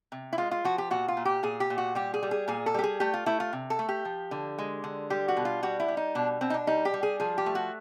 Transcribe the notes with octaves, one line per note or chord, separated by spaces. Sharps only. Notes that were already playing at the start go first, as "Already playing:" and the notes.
C3
E4
G#3 F4
F4
F3 F#4
G4
A#2 F#4
F4
A#2
G4
A#2 G#4
G4
A#2
F#4
G3 G4
G#4
G3
G#4
A#2 G#4
A4
G3 G4
G#4
A3 G4
F4
A3 E4
F4
C3
A4
A3
G4
F3
D3
G#3
D3
G3 G4
F#4
B2
F4
G3 F#4
E4
G3
D#4
B2 D4
B2 C4
D#4
D4
G3 D#4
G4
G3
G#4
F3 G#4
G4
A3
F#4